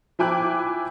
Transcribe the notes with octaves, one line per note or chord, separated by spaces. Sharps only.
F3 E4 G5 G#5 D6 F#6